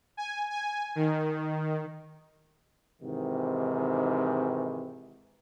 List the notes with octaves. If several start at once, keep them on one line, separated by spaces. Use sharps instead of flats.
G#5
G#5
D#3
G#2 C3 D#3 E3